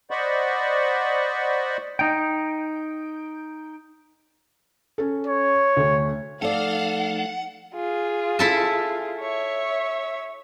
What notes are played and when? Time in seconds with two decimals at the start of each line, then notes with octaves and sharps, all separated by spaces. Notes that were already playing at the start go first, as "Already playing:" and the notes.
0.11 C5 D5 D#5 F#5 B5 C#6
1.99 D#4 G5
4.98 C#4 A4
5.27 C#5
5.77 D2 A3
6.42 F3 A3 D#4 A4 D5 F5 F#5
7.75 F4 G#4
8.39 E4 A4 A5
9.21 C#5 E5